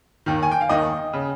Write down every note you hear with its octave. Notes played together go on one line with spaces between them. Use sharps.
D#2 D#3
G#5
G5
F5
D#2 D#3 D#5
C#3